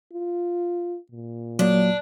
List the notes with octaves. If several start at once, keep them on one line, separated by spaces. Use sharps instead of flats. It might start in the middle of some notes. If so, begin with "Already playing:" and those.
F4
A#2
F#3 A#3 D4